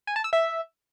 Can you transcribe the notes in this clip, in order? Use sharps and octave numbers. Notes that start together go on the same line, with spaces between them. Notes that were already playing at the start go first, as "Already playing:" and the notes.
G#5
A5
E6
E5